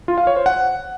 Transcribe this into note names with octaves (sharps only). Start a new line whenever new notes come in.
F4
F5
C#5
C5
F#5